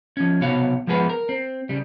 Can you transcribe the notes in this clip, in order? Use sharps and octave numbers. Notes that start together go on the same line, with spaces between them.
F3 C#4
B1 C3 B3 F#4 C#5 F5
F3 G#3 B3 G#4 B4
A#4
C4
C#3 G3